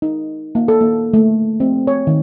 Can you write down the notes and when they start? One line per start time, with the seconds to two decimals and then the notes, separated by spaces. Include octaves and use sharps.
0.02 D#4
0.55 A#3
0.68 A4
0.81 A#3
1.13 A3
1.60 C4
1.87 C#5
2.07 D#3